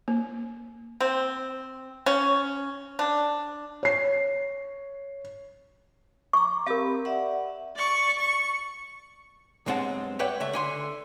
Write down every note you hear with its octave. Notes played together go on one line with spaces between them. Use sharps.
A#3
C4
C#4
D4
C#5 C7
A#5 C#6 D6
C4 G4 A#4 F5 B5
D5 E5 F#5
D5 C#6
C#6
B1 G2 G#3 C4 F#5 A5
B4 C#5 D5 E5 F#5 G5
C#3 A3 E5
D3 G#5 C6